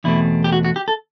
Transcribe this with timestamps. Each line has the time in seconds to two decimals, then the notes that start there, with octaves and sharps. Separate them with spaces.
0.04 E2 B2 A3 C4 E4
0.44 G4
0.52 F#4
0.65 F#4
0.76 G4
0.88 A4